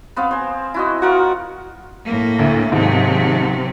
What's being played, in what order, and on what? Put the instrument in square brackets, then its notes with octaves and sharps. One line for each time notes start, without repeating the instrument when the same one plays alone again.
[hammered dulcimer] B3 C4 F5
C5 G#5
E4 F#4 D#5
[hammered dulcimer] F4 A#4 F#5 [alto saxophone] F#4
[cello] A2 A#3
[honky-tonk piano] D2 E4
[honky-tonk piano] D#2 G#2 [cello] C3 F#3